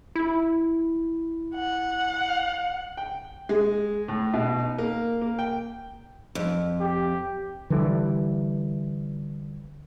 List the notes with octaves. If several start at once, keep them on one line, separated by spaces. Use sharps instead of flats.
E4
F#5
G5
G#3
A2
B2
D#4
A#3
A#3
G5
F2
G4
D3 E3 G3